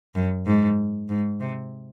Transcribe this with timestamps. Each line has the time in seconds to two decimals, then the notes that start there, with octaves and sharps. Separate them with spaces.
0.15 F#2
0.46 G#2
1.09 G#2
1.40 C3